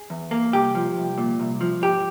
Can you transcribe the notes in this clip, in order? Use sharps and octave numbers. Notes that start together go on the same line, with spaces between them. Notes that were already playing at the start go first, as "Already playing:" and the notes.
Already playing: G#4
E2
A#3
C2 G4
F3
C2
A#2
C2
F3
G#2 G4